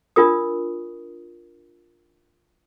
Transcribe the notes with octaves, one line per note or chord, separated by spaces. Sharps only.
D4 F4 A#4 D#6